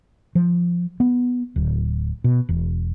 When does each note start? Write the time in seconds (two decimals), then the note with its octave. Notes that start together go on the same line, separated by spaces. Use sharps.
0.35 F3
1.00 B3
1.56 D1
2.24 B2
2.49 E1